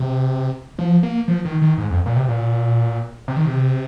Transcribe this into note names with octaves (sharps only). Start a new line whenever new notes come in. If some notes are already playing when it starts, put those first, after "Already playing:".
Already playing: C3
F3
A#3
F3
D#3
D#3
G#2
F2
A#2
C3
A#2
C3
D#3
C3